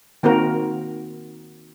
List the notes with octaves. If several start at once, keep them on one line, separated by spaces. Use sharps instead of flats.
D#3 A#3 C4 F#4 A#4